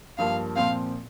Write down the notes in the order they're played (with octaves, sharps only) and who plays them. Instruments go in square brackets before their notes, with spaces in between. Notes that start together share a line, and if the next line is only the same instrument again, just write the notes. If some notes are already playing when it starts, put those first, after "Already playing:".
[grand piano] G2 F3 A#3 [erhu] F5
[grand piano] A#2 F3 C4 [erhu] F5